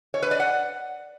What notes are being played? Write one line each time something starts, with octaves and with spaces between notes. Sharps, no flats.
C#5
B4
D5
F#5